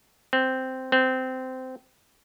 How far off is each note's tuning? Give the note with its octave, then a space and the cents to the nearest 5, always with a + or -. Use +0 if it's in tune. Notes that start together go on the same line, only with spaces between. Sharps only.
C4 -5
C4 -15